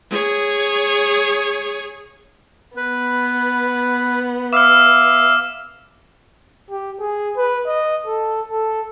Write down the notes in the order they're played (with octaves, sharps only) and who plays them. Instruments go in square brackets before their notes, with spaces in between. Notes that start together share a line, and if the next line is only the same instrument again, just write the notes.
[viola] G#4 C#5
[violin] B3 [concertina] B4
[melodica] E5 [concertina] F5 [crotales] D6 F6
[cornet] G4
G#4
B4
D#5
A4
A4